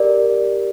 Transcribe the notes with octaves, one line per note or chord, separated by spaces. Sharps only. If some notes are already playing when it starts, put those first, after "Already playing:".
Already playing: G4 A#4 D5